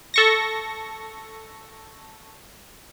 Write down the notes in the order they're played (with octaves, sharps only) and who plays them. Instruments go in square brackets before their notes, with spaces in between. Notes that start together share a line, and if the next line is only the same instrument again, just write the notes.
[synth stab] A4 C#6 A#6